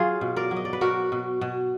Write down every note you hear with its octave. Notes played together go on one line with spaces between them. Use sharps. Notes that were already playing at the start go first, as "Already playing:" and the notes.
Already playing: F#3 F4 G#4
B2
A#4 D5
F#3
D#5
D5
B4
B2 F#4 A#4
B2
B2